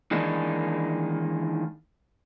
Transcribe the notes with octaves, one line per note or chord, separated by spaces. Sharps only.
D#3 E3 G#3 A#3 D4 D#4